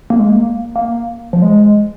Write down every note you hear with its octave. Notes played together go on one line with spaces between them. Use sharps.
A#3
G#3
A#3
A#3
F3
G#3